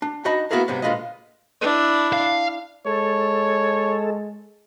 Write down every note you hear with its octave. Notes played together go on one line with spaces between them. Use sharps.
D4
D4 D#4 F#4 D#5 B5
A#3 B3 E4 F#4 G#4 A#4
G#2 C3 F#3 G3 B3
A#2 D3 G#3 F4 B4 D#5
D4 E4
F5
G#3 A4 C#5